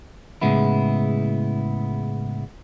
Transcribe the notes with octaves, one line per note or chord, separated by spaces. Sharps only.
A2 C#3 G#3 B3 E4